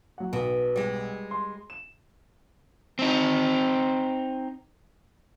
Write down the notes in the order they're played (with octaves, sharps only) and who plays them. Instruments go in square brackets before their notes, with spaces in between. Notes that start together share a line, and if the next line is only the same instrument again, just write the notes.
[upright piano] F#3 F#5
[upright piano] B1 [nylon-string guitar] B2
[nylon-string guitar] G3 G#3
[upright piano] C6
E7
[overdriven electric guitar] C4 D#4